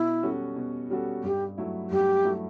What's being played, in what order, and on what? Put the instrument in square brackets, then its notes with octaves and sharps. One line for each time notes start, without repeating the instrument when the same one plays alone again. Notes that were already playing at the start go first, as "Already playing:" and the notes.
Already playing: [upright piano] B2 [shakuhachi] E4
[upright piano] G3 C#4 F#4 A4
B2
G3 C#4 F#4 A4
[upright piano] G2 [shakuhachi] G4
[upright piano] F#3 A3 E4
[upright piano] G2 [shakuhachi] G4
[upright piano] F#3 A3 E4